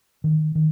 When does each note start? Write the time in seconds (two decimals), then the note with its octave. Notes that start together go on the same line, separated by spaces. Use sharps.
0.24 D#3
0.55 D#3